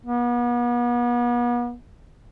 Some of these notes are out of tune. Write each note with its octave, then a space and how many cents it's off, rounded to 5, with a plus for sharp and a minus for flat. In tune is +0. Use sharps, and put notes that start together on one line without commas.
B3 -40